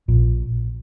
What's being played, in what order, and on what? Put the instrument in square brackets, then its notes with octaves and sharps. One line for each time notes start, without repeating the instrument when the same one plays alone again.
[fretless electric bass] A#1 A#2